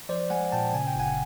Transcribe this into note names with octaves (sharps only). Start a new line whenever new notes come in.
F3 C5 D5
G#3 F#5 G#5
A#2 G5 A5
C#3 G#5
G5
G1 F#5 G#5